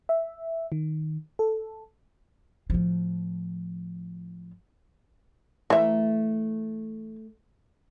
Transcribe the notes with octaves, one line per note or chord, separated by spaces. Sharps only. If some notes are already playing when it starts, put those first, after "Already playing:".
E5
D#3
A4
A2 F3
E3 A3 A#4 E5